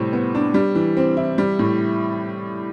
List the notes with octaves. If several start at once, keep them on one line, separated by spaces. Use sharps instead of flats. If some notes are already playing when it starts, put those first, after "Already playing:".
Already playing: A2 C3 G3
B3
D4
G3
E3
C4
E4
G3
A2